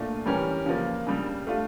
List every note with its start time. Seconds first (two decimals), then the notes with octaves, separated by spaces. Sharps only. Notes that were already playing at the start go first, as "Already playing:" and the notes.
Already playing: A#2 A3 D4 F4
0.26 E3 G3 C#4 G4 A#4
0.66 C#3 F3 A#3
1.07 C#3 G3 D4
1.47 A3 D4 F4